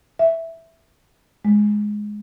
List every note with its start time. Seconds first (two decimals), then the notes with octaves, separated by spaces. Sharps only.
0.19 E5
1.45 G#3